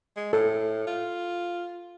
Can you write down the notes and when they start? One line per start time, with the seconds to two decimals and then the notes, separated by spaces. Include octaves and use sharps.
0.17 G#3
0.33 A2 A4
0.87 F4